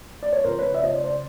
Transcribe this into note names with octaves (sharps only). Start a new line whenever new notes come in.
D5
C#5
C#2 C#3 F3 A#4 C5
B4 C#5
D5 E5
C#5 D#5
C5 D5
C5 D5